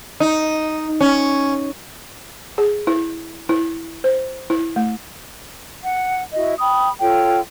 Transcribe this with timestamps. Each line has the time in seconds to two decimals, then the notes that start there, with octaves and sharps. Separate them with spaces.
0.20 D#4
1.01 C#4
2.58 G#4
2.87 E4
3.49 E4
4.04 C5
4.50 E4
4.76 A3
5.84 F#5
6.33 E4 F#4 D#5
6.59 G5 B5 D#6
7.00 F4 A4 C#5 G5